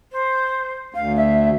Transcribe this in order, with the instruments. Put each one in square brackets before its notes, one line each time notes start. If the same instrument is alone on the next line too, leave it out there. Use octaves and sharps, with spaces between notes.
[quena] C5
[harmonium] D2 [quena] F5
[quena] E5